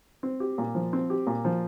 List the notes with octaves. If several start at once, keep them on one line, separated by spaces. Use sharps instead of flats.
C4
G4
A#2
F3
C4
G4
A#2
F3